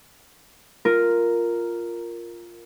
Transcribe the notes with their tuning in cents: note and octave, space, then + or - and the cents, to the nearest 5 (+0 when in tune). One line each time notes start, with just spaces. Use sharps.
F4 +0 A#4 +0